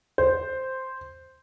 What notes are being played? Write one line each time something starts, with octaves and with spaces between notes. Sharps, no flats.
C5